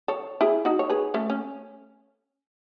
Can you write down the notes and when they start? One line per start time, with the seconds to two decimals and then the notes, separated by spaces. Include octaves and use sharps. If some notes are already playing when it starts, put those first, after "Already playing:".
0.08 A4 C#5
0.41 E4 G#4
0.65 D#4 F#4
0.79 C#5
0.90 G#4 B4
1.14 A3 C#4
1.30 C#4